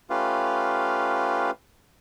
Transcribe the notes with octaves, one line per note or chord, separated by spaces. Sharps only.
A3 C#4 F4 G4 B4 F5